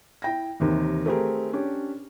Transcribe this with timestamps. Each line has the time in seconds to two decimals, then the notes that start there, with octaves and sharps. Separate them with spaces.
0.22 E4 G5 A#6
0.60 D#2 C3 D#3 E3
1.06 A3 C4 G4 G#4 A#4
1.53 C#4 D4 G4